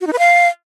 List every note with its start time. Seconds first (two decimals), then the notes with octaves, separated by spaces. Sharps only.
0.01 F#4
0.07 D#4
0.13 B4
0.19 F5